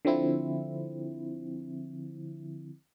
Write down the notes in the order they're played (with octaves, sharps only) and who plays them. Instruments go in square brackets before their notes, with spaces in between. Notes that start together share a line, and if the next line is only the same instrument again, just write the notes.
[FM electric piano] D3 F3 C4 E4